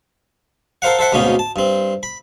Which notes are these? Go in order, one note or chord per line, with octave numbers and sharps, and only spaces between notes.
A4 A#4 C5 F5 F#5
A4 C5 E5 F#5
D2 G#2 B2 A#3 C#4 D#4
A5
G2 C4
B5